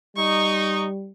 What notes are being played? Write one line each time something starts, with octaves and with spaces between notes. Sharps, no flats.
G3 D#4 C#6